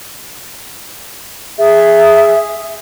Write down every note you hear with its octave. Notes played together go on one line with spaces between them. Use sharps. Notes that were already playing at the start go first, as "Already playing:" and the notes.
G#4 E5